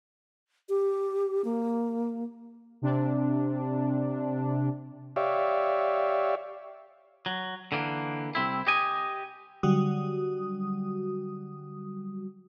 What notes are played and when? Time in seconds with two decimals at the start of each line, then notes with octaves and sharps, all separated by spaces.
0.69 G4
1.45 A#3
2.82 C3 D4
5.16 G4 C#5 D5 E5 F5
7.26 F#3
7.72 D3 E3 A#3
8.35 C2 C4 E4
8.67 G4 D#5 G#5
9.63 D3 F#3 G3 F#4 D#6